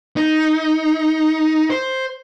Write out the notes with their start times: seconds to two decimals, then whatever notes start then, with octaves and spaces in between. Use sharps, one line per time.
0.16 D#4
1.70 C5